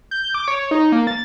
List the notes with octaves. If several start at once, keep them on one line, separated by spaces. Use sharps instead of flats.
G6
D6
C#5
D#4
A#3
A6